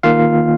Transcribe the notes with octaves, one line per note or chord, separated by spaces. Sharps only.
D#3 A#3 F4 F5